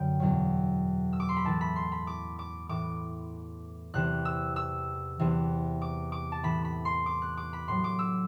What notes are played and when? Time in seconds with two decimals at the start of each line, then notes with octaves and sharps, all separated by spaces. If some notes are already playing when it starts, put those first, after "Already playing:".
Already playing: F#2 D3 G5
0.20 E2 B2 F#3
1.13 E6
1.20 D6
1.29 C6
1.37 B5
1.45 A2 E3 A5
1.61 B5
1.76 C6
1.92 B5
2.07 D6
2.39 D6
2.69 A2 E3 D6
3.94 E2 C3 E3 F#6
4.25 E6
4.56 E6
5.19 E2 C3 E3
5.82 D6
6.12 D6
6.32 A5
6.43 A2 E3 B5
6.65 B5
6.85 C6
7.06 D6
7.22 F#6
7.37 D6
7.53 B5
7.68 A2 F#3 C6
7.84 D6
7.99 E6